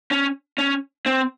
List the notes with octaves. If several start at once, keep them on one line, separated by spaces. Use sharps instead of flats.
C#4
C#4
C4